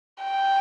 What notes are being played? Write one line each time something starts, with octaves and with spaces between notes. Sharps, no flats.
G5